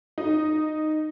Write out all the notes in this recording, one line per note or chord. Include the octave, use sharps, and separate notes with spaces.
D#4